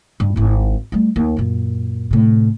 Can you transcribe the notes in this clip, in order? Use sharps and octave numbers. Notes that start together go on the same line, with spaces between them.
G2
G#1 E4
G3 A3
D#2
F#2 A#2
A2 C3